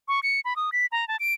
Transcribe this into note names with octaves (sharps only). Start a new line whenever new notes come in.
C#6
C#7
B5
D#6
B6
A#5
A5
D7